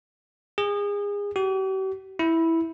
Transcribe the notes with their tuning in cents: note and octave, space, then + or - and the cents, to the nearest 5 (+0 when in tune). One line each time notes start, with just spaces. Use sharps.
G#4 -30
G4 -45
E4 -5